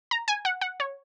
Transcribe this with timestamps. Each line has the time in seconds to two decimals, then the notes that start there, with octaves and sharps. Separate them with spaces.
0.11 A#5
0.28 G#5
0.45 F#5
0.61 F#5
0.80 C#5